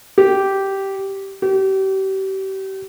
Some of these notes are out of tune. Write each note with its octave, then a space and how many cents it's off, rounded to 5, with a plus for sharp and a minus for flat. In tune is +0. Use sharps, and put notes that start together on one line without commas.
G4 -10
G4 -35